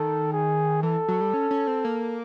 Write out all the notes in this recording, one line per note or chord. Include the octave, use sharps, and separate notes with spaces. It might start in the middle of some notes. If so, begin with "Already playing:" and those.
Already playing: D#3 A4
G#4
E3 A4
F#3
G3
C#4
C#4
C4
A#3